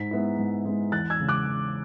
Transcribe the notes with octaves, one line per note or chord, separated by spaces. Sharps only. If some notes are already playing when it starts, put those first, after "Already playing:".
Already playing: G#2 B6
G#3 B3 E4
G#2
G#3 B3 E4
E2 F#6 A6
E6 G#6
C#3 G#3
D6 F#6
E2